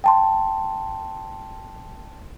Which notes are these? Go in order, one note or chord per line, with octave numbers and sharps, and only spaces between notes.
G5 A5 C6